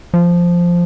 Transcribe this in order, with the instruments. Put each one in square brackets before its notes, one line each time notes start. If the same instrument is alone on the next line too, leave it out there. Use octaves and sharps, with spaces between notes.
[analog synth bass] F3